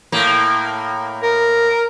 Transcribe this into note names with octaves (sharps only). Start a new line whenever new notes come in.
A2 A#3
A#4